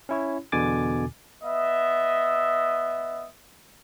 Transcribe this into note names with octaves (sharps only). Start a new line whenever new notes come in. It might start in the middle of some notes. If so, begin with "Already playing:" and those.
C#4 E4 C#5
E2 B2 D3 G#5 D6 A6
B3 D#5 E5